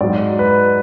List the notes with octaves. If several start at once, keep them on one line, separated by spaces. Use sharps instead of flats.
G#2 F#3 D5
B4